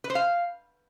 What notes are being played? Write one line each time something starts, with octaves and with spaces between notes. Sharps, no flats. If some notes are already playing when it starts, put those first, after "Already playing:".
B4
C5
F5